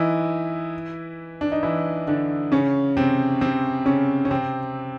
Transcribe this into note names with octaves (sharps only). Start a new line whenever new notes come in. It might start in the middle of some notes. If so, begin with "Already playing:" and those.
Already playing: E3 D#4 E4
D4
D#4
E3 E4
D3 D4
C#3 C#4
C3 C4
C3 C4
C#3 C#4
C#4
C3 C4